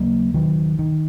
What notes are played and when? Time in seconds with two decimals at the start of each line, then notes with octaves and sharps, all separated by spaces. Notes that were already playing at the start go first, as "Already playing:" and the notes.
Already playing: D#2 C#3 F#3 A#3
0.34 D#3 F#3
0.79 D#3